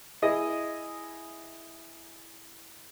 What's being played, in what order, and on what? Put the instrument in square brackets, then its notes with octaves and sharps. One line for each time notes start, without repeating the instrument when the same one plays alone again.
[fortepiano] E4 G#4 D#5